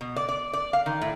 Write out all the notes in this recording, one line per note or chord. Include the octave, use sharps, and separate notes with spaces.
B2
D5
D5
D5
F5
D#3
A2